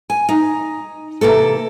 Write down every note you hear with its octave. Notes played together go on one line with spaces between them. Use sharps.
G#5
D#4
C3 E3 A#3 A4